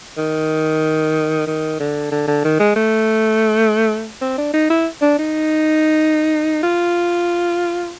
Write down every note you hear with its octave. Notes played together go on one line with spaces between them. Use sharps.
D#3
D#3
D3
D3
D3
D#3
G#3
A3
C4
D4
D#4
E4
D4
D#4
F4